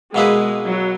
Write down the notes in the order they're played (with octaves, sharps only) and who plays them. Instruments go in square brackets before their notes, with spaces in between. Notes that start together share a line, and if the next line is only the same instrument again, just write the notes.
[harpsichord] B2 A#3 E4 G#4 B4 [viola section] G#3
[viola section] F#3